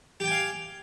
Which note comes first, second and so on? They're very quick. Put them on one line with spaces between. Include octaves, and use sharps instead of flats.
G4 G5 G#5 F5